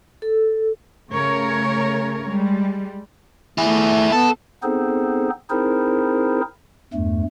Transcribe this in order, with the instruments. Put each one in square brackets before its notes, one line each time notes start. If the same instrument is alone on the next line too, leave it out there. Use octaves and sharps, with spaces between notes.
[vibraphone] A4
[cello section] C#3 A3 A#4 C#5
G3 G#3
[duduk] A3 [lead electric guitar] E4 G#4
[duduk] B3 [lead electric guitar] A4
[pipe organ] B3 C4 D#4 G#4 A4 C5
C4 D#4 E4 G#4 A#4 C5
E2 G2 A3